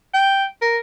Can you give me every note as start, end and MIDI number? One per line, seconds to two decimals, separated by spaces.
0.14 0.45 79
0.62 0.78 70